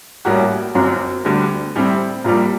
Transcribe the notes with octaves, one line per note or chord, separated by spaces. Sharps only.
A1 A2 G3 A#3 F#4
G1 F#2 F#3 C4
D2 D3 G3
A2 G3 C4
A#1 A#2 G3 A#3